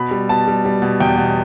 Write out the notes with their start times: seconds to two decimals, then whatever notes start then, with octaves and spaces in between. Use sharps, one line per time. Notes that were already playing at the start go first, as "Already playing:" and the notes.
Already playing: B2 B5
0.11 G3
0.29 B2 A5
0.48 G3
0.65 G3
0.82 B2
1.00 E2 G5
1.18 B2